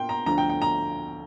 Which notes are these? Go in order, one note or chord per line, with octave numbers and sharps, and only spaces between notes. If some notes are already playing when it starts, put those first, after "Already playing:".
Already playing: A#2 A#3 D4 G5 C6
A#5
D2 D3 F3 D4 A#5
G5
G5
A#5